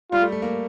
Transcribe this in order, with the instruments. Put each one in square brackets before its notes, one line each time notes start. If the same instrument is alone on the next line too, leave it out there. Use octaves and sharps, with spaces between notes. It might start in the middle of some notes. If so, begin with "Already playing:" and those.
[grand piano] G3 [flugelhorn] F4
[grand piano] A3
A3
A#3